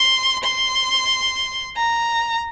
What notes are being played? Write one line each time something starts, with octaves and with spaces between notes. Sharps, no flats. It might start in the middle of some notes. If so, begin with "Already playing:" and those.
Already playing: C6
C6
A#5